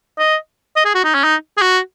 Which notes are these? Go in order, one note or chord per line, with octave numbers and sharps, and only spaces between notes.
D#5
D#5
G#4
F#4
D#4
C#4
D#4
G#4
F#4